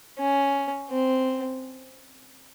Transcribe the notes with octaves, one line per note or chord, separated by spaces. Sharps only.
C#4
C4